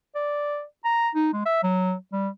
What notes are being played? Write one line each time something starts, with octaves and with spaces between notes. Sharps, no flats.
D5
A#5
D#4
G#3
E5
F#3
G3